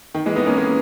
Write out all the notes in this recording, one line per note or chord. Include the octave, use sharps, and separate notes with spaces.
D#3
E3 G#3
B3 D#4
A#3 C#4
A#3 C#4